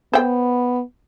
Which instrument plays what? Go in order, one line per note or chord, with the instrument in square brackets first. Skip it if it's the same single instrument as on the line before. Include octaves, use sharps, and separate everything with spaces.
[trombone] B3 [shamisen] C5 G5